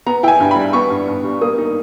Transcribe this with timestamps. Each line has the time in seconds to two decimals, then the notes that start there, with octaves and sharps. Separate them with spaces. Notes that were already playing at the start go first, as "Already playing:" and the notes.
0.07 B3 A#5
0.23 E4 G5
0.28 G#5
0.40 G2
0.51 B5
0.56 G3
0.73 B3 C#6
0.90 G2
1.08 G2
1.24 G3
1.41 A#3 D#6
1.58 D#4